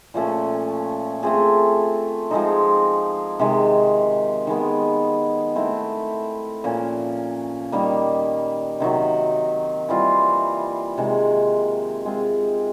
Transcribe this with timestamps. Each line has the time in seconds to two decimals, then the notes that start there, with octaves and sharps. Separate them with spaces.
0.14 A#2 F3 A3 C#4
1.23 A3 C4 F4 G#4
2.31 F3 G#3 C4 D#4
3.39 C3 D#3 G#3
4.47 D#3 G#3 B3
5.55 A3 C4 E4
6.64 A#2 F3 A#3 C#4
7.72 D#3 G3 A#3
8.80 C3 D#3 F#3
9.89 E3 G3 C4 F4
10.98 C3 D#3 G#3
12.05 G#3 C4 F4